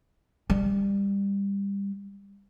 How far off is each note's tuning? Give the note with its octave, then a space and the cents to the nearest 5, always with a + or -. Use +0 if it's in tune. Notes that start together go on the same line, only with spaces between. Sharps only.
G3 +20